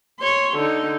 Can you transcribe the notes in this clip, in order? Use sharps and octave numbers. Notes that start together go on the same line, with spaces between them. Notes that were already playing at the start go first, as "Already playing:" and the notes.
C#5 C6
D3 D#4